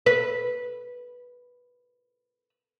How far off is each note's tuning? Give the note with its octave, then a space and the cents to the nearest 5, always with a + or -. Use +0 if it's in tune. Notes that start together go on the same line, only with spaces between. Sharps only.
B4 -10